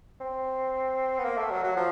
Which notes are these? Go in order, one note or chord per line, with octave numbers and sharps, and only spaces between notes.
C4
B3
A#3
A3
F#3
F#3
F3